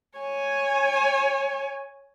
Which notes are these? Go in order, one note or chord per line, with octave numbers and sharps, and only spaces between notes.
C#5 G#5